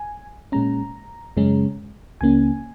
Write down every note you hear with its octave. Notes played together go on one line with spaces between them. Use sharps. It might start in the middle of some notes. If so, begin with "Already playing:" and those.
Already playing: G#5
A#2 G#3 C#4 A#5
F#2 C#3 G#3 C#4
C#2 C#3 A#3 C#4 G#5